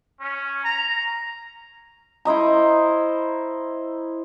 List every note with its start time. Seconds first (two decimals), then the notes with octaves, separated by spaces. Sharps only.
0.21 C#4
0.63 A#5
2.25 E4 C5 D#5 A#5